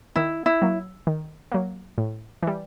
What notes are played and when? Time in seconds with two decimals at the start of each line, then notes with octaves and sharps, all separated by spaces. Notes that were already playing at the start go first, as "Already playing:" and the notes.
0.16 D#3 E4
0.46 E4
0.62 F#3 A#3
1.07 D#3
1.52 F#3 A#3
1.98 A2
2.42 E3 G3